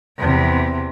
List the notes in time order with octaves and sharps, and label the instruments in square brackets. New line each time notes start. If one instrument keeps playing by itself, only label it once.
[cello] E2 C3